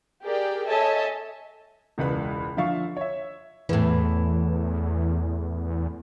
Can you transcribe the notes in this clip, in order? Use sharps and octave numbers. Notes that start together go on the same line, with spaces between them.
G4 G#4 A#4 D5 G5
A4 C#5 D#5 E5 G#5 A5
E1 C#2 B4 B5
D3 F3 E5 F5 C#6
C#5 E5
E2 A2 E3